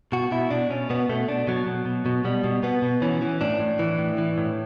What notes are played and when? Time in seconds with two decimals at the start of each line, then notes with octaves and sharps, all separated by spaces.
0.12 B2 F#4
0.31 B2 E4
0.50 B2 D4
0.70 B2 C#4
0.90 B2 B3
1.09 B2 A3
1.28 B2 D4
1.47 B2 F#3
1.67 B2
1.86 B2
2.06 B2
2.25 B2 G3
2.44 B2
2.63 B2 B3
2.82 B2
3.02 E3 C#4
3.22 E3
3.41 A2 D4
3.60 A2
3.79 E3
3.99 A2
4.18 E3
4.38 A2